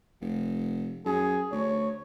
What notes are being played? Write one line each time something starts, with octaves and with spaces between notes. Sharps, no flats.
F1
F#2 G#4
D2 C#5